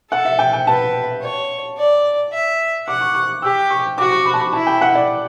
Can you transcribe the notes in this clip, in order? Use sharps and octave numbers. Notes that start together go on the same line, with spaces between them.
A4 F#5
E5
G5
G5
B4 A5
C#5
D5
E5
F#5 D6
C#6
C#6
G4 E6
C#6
F#4 D6
C#6
B5
A5
B5
E4 A5
G5
F#5
D5